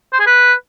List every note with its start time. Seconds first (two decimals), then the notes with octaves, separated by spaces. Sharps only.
0.13 C5
0.20 G#4
0.27 B4